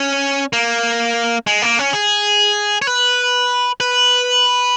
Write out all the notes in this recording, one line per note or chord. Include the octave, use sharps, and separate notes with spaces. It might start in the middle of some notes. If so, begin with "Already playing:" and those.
Already playing: C#4
A#3
G#3
A#3
C#4
G#4
C#5
B4
B4